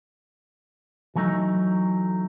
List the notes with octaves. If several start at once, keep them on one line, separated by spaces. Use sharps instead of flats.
E3 F#3 A3 D#4